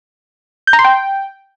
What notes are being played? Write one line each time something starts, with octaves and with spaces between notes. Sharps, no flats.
G6
A#5
C6
G5